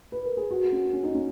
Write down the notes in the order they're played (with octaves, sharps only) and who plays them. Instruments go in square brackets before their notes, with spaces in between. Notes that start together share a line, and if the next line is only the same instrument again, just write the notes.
[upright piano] B4
A#4
G#4
F#4
C#4
C#4
D#4
C#4